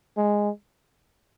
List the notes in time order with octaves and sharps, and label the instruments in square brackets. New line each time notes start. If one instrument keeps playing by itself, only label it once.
[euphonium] G#3